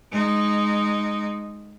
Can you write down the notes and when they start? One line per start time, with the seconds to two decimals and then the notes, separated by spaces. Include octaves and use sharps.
0.12 G#3 D#4